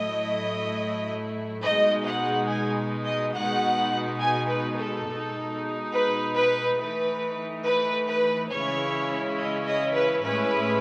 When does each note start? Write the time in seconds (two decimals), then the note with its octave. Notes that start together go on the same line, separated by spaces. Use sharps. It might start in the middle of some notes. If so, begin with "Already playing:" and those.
Already playing: A2 F#3 A3 E4 D#5
1.62 B2 G#3 D#4 D#5
2.04 F#5
2.47 G#5
3.05 D#5
3.34 B2 G#3 D#4 F#5
4.20 G#5
4.49 B4
4.77 A4
5.07 B2 G#3 D#4
5.92 B4
6.35 B4
6.78 E3 A3 D#4 B4
7.64 B4
8.07 B4
8.50 C#3 E3 G#3 C#4 E4 C#5
9.36 D#5
9.65 D#5
9.93 B4
10.22 A2 G#3 C#4 E4 B4